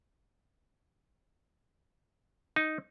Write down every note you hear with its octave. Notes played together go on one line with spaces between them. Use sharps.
D#4